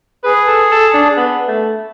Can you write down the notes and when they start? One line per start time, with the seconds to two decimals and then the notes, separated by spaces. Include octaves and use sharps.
0.24 G#4 B4
0.47 A4
0.71 A4
0.94 D4
1.17 B3
1.48 A3